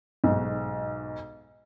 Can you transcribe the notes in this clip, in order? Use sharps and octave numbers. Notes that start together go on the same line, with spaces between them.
B1 G#2